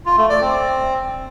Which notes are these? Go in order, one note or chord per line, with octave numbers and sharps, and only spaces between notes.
F4
A3
D5
C4